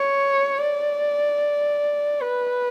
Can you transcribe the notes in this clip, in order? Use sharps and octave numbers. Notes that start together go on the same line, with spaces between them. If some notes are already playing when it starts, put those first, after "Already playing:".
Already playing: C#5
D5
B4